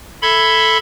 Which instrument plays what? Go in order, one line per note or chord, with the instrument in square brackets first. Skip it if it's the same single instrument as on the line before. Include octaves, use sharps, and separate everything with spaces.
[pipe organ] A4 E5 B5 C6 G#6